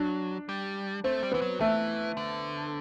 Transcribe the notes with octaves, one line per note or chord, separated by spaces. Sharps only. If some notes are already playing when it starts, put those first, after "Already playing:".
Already playing: F#3 D4
G3
A3 C4
G3
E3 B3
F#3
E3 A3
D3